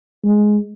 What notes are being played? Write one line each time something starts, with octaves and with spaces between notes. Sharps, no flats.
G#3